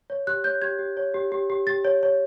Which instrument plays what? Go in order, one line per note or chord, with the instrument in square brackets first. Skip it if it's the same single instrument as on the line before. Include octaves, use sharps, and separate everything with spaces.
[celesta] C#5
G4 F#6
C#5 G6
G4 G#6
G4
C#5
G4
G4
G4
G4 A6
C#5
C#5